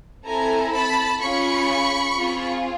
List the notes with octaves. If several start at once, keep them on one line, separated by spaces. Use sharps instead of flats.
C4 E4 A4 G#5 A#5
A5 B5
C#4 F4 G#4 B5 C#6
C4 F4 G#4